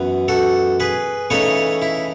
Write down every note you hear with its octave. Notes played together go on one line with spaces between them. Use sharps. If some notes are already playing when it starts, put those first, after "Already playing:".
Already playing: F#2 E3 B3
F#4 A4
G#4 B4
C#3 E3 A3 D#4 A4 C#5
E4